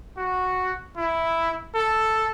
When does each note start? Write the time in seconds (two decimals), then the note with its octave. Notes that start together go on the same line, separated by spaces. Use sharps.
0.17 F#4
0.97 E4
1.75 A4